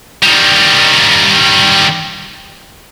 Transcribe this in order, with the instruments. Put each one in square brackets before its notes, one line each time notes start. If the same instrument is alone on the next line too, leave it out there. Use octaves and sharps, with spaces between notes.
[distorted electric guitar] D#3 G3